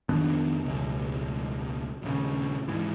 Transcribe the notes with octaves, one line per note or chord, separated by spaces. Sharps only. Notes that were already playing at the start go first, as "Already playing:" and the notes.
F2 D#3 B3 D4
E1 C#2
D#1 D#2 C#3
G#2 E3